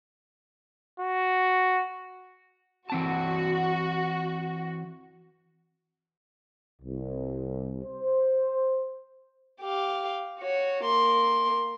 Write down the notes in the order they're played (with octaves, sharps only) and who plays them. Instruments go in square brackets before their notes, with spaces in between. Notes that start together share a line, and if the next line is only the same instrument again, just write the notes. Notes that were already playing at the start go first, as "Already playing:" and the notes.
[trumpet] F#4
[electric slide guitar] E3 C4 A5 [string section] F#4
[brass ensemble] C2
C5
[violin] G4 F5
F#4 C#5
A#3 C6